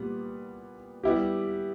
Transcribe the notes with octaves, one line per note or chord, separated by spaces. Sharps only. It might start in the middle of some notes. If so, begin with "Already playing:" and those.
Already playing: A#2 G3 B3
G3 B3 E4 G4